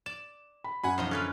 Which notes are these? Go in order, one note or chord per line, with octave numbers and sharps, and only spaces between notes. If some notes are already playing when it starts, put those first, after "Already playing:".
D5 E7
B5
F#2 F#5 G#5 B5
B1 F3 D#4 D#5
D3 C#4 F4 B4